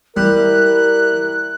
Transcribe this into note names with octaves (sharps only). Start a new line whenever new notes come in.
G3 E4 A#4 F#6